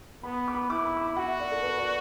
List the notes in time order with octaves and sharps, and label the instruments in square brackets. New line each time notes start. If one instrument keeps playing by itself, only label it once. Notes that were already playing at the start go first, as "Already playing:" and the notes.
[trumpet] B3 [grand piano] B5
[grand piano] D6
B5
[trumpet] E4 [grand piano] D6
[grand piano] B5
D6
B5
[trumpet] F#4 [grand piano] F#5
[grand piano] E5
D5
A4
B4
D5